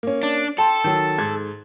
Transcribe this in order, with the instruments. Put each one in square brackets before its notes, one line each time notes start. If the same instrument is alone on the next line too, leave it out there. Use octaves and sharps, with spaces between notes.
[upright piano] A#3 C#4
[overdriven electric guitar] D4
[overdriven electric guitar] A4 [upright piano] G5 A5 C6
[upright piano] D#3 F#3
G#2 G#6